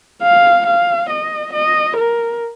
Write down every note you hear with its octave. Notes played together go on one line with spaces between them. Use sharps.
F5
F5
D#5
D#5
A#4